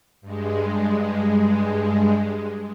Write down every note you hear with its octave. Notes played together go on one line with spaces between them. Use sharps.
G2 G#3